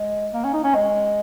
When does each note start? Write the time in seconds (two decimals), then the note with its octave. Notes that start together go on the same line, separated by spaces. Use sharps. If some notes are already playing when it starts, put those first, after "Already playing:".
Already playing: G#3
0.34 A#3
0.44 C#4
0.53 D#4
0.64 C#4
0.74 G#3